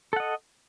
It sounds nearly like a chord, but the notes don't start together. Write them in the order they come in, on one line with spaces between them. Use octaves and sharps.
A4 F#5 D#5